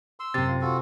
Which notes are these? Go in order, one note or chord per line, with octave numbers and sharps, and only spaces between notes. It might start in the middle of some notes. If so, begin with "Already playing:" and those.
C6 E6
F#2 C3 A6
F4
F4 F#4 A4